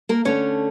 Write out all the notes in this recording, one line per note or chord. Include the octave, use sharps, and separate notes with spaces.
A#3 A#4
D3 A3 C#4 D4 C#5